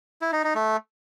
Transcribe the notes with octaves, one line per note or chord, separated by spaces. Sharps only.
E4
D#4
D#4
A3